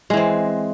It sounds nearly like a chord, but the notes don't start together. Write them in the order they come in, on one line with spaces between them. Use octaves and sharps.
G#3 E3 C4